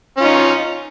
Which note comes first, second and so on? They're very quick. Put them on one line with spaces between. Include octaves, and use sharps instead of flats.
C#4 F4 D#4